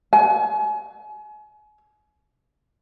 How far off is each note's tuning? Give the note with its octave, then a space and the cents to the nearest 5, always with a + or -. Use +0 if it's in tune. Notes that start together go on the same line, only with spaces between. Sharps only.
G#5 +35